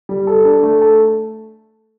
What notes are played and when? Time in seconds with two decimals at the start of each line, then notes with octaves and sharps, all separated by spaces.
0.09 G3
0.27 A4
0.45 D4
0.63 A3
0.82 A4